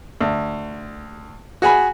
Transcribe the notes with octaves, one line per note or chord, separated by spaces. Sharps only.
D2
F#4 G#4 G#5 B5